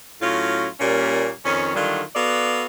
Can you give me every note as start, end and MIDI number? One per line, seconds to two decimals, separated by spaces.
0.22 0.66 45
0.22 0.66 54
0.22 0.66 61
0.22 0.66 65
0.79 1.31 46
0.79 1.31 55
0.79 1.31 58
0.79 1.31 61
1.45 1.72 41
1.45 1.72 51
1.45 1.72 61
1.75 2.02 50
1.75 2.02 51
1.75 2.02 54
1.75 2.02 55
1.75 2.02 65
2.15 2.66 59
2.15 2.66 66
2.15 2.66 69
2.15 2.66 74
2.15 2.66 77